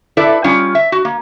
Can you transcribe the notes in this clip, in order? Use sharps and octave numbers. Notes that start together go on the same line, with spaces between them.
E4 A4 B4 D5
G3 C#4 F4
E5
F#4
A#3